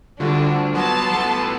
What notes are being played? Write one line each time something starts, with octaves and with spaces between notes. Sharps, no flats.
D2 D3 G3 D4 F4 F#4
F#3 B3 A5 C6
E3 A3